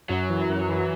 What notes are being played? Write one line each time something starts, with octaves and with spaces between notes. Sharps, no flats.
F#2 F#3
E3
F#2
E3